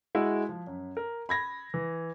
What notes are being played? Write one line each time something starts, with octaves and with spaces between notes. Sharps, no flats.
G#3 E4 F#4
F3
F#2
A#4
B5 G#6 A#6
E3